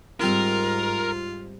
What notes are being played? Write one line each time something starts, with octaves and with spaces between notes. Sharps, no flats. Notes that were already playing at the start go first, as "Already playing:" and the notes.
G#2 G3 C4 F4 A#4 E7